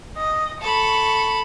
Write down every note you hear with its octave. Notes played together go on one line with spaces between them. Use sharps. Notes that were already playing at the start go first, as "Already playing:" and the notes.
D#5
A4 B5 C#6